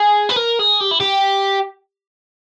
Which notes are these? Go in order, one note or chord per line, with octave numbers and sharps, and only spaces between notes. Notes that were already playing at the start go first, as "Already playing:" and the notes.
Already playing: G#4
B4
A#4
G#4
G4
E4
G4